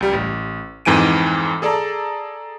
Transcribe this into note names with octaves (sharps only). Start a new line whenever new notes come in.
C#2 G3
A1
F2 G#2 E3 G#5 D7 D#7
G#4 A4 D5 A5 A#5